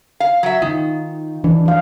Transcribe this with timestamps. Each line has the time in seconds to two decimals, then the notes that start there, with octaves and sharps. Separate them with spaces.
0.20 F5
0.43 F#3 E5
0.62 D#3 D#4 F4
1.44 E3 D4
1.66 F3 F5